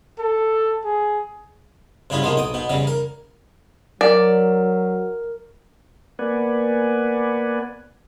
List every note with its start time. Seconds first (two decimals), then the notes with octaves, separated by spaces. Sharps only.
0.19 A4
0.84 G#4
2.10 G2 C#3 B3 E4 F4
2.22 C3 F3 G#3 A#3 B3
2.36 B1 G5 D#6
2.54 B2 B3
2.70 C#3 E3 G3
2.87 A#4
4.01 F#3 A#4 D5
6.19 A#3 B3 B4 D5 F#5 G#5